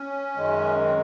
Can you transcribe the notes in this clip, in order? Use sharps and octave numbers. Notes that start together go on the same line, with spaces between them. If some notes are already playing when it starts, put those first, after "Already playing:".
Already playing: C#4
F#2 D#3 G#3
C4